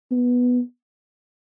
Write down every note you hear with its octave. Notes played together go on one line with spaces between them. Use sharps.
B3